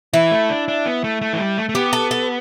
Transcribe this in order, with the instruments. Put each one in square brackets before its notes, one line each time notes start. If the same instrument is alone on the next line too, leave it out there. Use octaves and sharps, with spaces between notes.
[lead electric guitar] E3 [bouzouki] E4
[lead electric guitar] A3
D4
D4
B3
A3
A3
E3
G3
A3
A3
[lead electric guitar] B3 [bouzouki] G4
[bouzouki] A4
A4